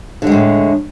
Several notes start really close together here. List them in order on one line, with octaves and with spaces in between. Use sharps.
D3 G#3 A2